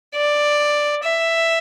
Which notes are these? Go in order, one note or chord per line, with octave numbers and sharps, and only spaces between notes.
D5
E5